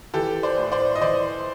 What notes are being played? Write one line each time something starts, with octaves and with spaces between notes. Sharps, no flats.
E3 G4 A4
C5 D5
A2
C5 D5
D#5
E3 C5 D5